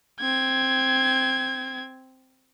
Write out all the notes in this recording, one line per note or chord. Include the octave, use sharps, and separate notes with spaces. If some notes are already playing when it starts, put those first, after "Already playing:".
C4 G#6